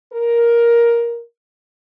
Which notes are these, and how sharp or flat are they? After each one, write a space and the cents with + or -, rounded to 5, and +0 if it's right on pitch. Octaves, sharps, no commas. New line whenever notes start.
A#4 +10